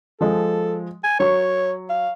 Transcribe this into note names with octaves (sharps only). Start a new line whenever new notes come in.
F3 G#3 A4
G#5
F#3 C#5 C#6
F5